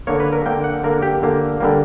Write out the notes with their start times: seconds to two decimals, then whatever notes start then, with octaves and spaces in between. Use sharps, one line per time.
0.07 D3 A#3 C#5
0.20 B4
0.33 A#4
0.46 D3 A#3 G5
0.64 F#5
0.84 D3 A#3 A#4
1.02 G4
1.22 D3 A#3
1.60 D3 G3 A#3